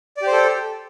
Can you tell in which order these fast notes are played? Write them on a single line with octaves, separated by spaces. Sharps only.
D5 G4 C5 A4